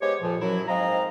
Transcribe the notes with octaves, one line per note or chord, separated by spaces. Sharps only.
G#3 B3 G4 C5 C#5
F2 A#2 F3
F#2 F#3 E4
G#2 C4 D#5 F5 A#5